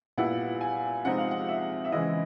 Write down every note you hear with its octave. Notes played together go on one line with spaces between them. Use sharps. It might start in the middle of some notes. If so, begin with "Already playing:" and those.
A#2 G3 B3 E4 F#5
G#5
C3 F3 G#3 C4 D#4 F#5
F5
F#5
E5
E5
C#3 E3 G#3 C4 E4 D#5